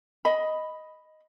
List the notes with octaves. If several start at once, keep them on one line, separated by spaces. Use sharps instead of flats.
D#5 B5